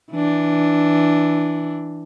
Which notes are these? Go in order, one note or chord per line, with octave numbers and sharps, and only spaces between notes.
E3 D4